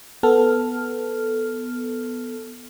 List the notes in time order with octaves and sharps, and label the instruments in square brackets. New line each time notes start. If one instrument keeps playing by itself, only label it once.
[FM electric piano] B3 A4 F6